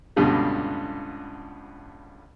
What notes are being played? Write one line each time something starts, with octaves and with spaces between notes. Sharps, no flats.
C#2 G2 B2 D3 G3